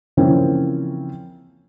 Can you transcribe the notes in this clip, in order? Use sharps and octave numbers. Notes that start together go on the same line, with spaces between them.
C#3 E3 F3 A#3 C4 C#4